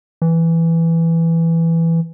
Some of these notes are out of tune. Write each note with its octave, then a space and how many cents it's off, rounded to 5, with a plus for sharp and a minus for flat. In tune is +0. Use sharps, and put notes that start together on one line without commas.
E3 +5